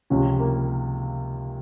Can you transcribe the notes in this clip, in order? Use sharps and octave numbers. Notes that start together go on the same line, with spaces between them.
C#2 C3 F3 C#4
A#3